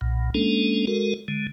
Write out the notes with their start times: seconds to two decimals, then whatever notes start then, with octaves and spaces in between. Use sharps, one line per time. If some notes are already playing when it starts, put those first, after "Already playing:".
0.01 B1 A#2
0.34 G#3 A#3 C#4 D4 A4
0.87 G#3 F#4 A4 A#4
1.28 D3 G#3